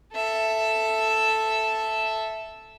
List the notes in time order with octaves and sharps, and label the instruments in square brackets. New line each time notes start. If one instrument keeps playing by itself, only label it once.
[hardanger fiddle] A4 E5